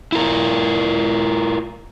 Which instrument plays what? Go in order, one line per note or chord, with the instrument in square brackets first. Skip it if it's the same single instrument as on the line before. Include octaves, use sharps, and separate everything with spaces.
[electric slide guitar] E4 F4 A#4